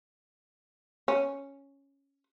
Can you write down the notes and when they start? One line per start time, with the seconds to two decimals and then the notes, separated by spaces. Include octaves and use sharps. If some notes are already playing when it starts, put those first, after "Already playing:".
1.08 C#4